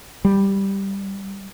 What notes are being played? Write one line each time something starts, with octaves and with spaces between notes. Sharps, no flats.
G3